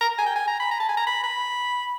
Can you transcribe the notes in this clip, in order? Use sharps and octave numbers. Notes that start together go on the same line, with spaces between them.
A#5
G#5
G5
G#5
A#5
B5
A#5
A5
G#5
A#5
B5
B5